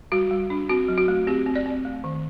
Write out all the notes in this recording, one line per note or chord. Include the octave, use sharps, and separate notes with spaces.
G3 F#4
G3
D4
C4 F#4
F#3
F#4
A3
C4 G4
C4
D5
C4
A3
D#3